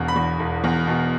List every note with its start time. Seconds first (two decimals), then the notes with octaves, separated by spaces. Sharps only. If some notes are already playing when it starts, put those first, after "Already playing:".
Already playing: E1 E2 B2
0.08 B5
0.16 E2
0.39 E1
0.64 E2
0.87 B2